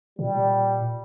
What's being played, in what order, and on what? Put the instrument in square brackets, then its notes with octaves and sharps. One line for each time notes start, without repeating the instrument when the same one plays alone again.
[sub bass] A#2 [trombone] G3